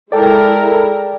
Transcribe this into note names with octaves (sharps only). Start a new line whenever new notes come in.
G#3 E4 A4 A#4 D5 G5